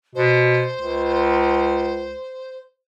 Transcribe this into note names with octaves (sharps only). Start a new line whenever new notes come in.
B2 C5
C#2